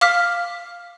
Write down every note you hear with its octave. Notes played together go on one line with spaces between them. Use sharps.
F5 D6 F6 B6